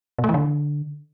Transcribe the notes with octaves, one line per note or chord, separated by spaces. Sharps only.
B2
A3
E3
D3